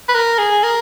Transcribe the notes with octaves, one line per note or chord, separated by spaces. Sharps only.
B4
A#4
G#4
A#4